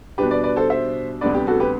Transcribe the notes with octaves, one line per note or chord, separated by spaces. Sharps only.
B2 G3 D4 G4 B4
B4 D5
B4 D5
A4 C5
C5 E5
D2 C3 G3 B3 D4 B4 D5
G4
F#4 A4
G4 B4